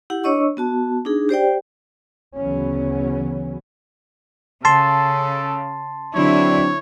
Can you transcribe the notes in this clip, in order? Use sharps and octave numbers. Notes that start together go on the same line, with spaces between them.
E4 G4 F#5
D4 C#5 D#5 C#6 E6
B3 F#4 A5
D4 D#4 G#4
G4 C5 D5 G5
D2 C#3 E3 F#3 B3 C#4
C#3 A4 A5 C6
D3 F#3 C4 D4 E4 C#5